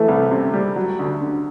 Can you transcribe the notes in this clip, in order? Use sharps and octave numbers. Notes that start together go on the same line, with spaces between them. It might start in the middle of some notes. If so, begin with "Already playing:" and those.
Already playing: E3 A3
C2
C3
G3
F#3
D2
D3